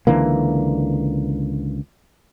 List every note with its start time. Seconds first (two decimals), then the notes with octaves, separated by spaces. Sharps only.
0.07 C#2 D3 E3 A#3